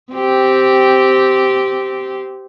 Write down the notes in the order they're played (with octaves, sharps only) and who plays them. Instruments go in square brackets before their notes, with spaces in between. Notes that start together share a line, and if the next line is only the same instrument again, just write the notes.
[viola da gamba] C4 G4